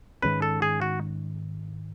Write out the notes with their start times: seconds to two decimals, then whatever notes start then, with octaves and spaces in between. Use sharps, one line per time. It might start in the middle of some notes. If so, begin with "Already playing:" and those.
0.22 G#2 D#3 G#3 C#4 B4
0.42 A4
0.62 G#4
0.82 F#4